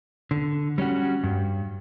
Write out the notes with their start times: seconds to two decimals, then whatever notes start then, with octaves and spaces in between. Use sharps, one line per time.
0.31 D3
0.78 G3 C#4 F#4
1.24 G2